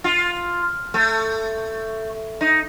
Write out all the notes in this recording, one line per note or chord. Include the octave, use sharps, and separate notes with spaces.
F4
A3
D#4